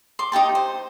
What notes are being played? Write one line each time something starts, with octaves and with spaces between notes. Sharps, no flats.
C6 D6
D#4 G4 G5 A5
C5